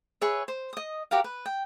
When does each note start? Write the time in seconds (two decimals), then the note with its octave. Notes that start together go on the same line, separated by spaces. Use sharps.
0.21 G#4 B4 C#5 E5
0.48 C5
0.73 D#5 D#6
1.11 F#4 G4 A#4 F5
1.24 B4
1.46 G5